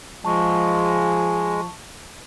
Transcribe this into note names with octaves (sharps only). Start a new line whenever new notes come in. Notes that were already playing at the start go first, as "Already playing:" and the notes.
F3 G#3 A5 C#6